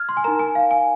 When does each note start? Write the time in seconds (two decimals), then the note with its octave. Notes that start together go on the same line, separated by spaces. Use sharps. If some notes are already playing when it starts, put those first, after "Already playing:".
Already playing: F6 G#6
0.09 C6
0.17 G#5
0.24 D#4 A#4 A#5
0.39 G#5
0.55 F5
0.71 G#5